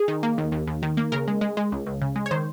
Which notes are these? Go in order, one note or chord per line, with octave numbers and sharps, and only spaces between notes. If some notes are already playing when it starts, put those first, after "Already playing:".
Already playing: G#4
D#3
A#3
D#2
D#2
D#2
D#3
A#3
C#3 A#4
G#3
G#3
G#3
C#2
C#2
C#3
G#3
C#5
D#3 C5